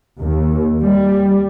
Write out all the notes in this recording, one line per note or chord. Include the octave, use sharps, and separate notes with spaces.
D#2
G3